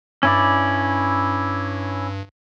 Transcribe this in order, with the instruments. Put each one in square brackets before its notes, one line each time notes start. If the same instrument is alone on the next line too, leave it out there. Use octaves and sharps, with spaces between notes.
[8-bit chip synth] G2 [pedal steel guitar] C#4 E4 D5